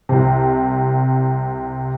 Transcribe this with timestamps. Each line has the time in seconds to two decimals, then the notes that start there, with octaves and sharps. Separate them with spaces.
0.09 C2 C3